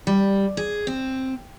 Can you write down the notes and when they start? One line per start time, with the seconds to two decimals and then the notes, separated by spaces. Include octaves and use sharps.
0.07 G3
0.57 G#4
0.87 C4